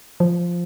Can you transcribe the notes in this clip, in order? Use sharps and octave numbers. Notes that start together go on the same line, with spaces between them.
F3